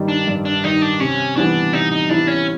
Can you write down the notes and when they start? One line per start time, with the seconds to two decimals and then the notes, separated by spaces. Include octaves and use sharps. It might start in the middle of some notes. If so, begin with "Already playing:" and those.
Already playing: G2 D#3 G3
0.09 D4
0.28 G2
0.45 D4
0.64 D#3 G3 D#4
0.82 D4
1.00 C3 C#4
1.36 E3 G3 B3 D4 E4
1.73 C3 D#4
1.92 D#4
2.09 E3 G3 B3 D4 E4
2.27 C#4